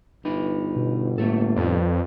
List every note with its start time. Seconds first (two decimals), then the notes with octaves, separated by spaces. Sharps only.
0.25 G1 D#4 B4
0.76 B2
1.18 A2 A3 A#3 A4
1.56 F2 B4 D5